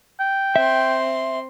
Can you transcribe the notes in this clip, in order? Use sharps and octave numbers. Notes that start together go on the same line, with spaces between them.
G5
C4 E5 C6